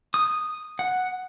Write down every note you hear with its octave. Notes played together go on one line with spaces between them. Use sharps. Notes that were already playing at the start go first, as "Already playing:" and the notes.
D#6
F#5